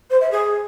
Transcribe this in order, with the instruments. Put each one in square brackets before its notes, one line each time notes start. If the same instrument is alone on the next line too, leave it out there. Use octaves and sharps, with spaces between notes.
[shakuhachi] C5
E5
G#4